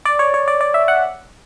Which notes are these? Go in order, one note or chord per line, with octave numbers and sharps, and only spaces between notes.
D5
C#5
C#5
D5
D5
E5
F#5